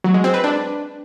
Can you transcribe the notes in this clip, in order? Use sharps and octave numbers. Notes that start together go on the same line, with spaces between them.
F#3
G#3
C4
B4
D4